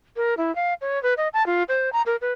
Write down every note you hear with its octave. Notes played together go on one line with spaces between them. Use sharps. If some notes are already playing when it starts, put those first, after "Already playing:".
A#4
E4
F5
C#5
B4
D#5
A5
F4
C5
A#5
A#4
B4